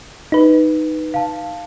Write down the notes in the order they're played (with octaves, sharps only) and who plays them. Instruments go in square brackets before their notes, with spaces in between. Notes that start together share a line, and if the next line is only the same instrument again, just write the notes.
[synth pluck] D#4 B4
[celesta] F5 A5